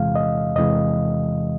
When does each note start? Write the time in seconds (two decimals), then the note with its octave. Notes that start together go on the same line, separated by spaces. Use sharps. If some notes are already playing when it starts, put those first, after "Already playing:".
Already playing: E2 C3 E3 G#3 F5
0.15 D#5
0.56 E2 C3 E3 G#3 D#5